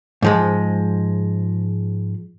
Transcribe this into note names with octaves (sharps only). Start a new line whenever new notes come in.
G#2 F3 G#3